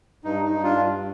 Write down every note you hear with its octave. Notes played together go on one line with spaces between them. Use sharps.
G2 D#4
D#4
G2
D4 F4
G2